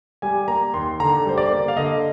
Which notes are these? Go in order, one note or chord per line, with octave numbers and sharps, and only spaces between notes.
G3 G#5
A#3 A#5
D#2 C6
D3 A#5
G3 C5
D5
A#3
F5
D3 D#5